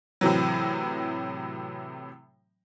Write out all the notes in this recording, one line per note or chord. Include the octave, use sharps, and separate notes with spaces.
A2 C3 E3 F#3